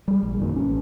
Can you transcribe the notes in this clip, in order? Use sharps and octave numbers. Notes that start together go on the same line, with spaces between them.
G3 G#3
A#1
F#2 A#2 D#3
A1 C#4